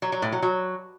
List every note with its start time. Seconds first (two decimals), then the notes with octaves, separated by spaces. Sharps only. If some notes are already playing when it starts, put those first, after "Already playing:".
0.02 F#3
0.12 F#3
0.22 A2
0.32 F#3
0.42 F#3